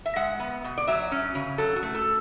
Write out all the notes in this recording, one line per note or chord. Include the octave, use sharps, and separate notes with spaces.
E5
G#3 F#5
B3
B2
D5
F#3 E5
C#4
C#3
F#3 A4
F#4
A3
A4